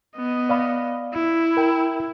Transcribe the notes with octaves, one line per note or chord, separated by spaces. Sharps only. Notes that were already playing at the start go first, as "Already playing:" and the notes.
B3 D#5
D5 F5 B5
E4
A#4 G5